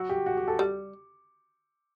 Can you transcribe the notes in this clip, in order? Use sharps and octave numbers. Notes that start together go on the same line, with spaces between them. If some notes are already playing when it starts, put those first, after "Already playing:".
Already playing: F#3 F#4
G4
F#4
G4
A4
G3